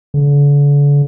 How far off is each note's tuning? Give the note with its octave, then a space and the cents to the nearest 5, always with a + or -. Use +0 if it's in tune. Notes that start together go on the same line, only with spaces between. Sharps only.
D3 -40